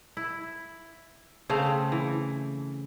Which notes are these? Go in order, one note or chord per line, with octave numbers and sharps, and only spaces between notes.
E4
C#3 A3 C4 F5
E3